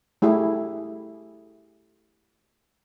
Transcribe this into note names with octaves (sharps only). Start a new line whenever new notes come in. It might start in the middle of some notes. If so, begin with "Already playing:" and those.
A3 E4 G4 G#4